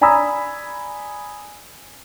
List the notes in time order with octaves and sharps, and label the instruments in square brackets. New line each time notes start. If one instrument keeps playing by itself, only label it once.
[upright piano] D5 G#5 A#5 B5 D#6 E6